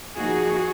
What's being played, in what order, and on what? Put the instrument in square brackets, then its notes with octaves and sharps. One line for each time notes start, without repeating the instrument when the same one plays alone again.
[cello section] F3 A#3 D#4 F#4 G#4